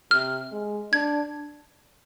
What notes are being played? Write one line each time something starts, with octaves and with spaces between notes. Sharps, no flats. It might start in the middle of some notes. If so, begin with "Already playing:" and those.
C3 F6
G#3
D4 G#6